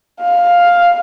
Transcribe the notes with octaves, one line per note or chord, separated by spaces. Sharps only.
F5